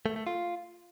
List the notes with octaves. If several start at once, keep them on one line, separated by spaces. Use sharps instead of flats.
A3
A3
F4